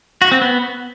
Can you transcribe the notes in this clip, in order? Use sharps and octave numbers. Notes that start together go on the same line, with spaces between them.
F#4
C4
B3